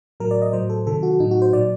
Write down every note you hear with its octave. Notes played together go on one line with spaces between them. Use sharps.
A2 F#3 A#4
D5
D#5
A2 F#3 C5
A4
C3 D#3 F#3 A4
F#4
A2 F#3 D#4
F#4
C5
A#2 F#3 D5